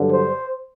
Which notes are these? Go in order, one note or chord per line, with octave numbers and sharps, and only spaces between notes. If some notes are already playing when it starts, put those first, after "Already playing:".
Already playing: G2 D3 F#3
C5